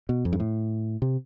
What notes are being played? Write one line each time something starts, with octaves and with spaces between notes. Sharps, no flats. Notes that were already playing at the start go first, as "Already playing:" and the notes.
B2
F2
G2
A2
C3